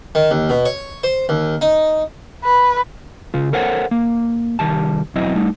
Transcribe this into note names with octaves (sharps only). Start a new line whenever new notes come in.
D#3
D#2
B2
C#5
C5
D#2
D#4
B4
C#3 F4
A4 A#4 C5 C#5 F#5
A#3
C2 D#3 G3 A5
B1 E2 F#3 C4 E4 D#5
G3 A3 D#4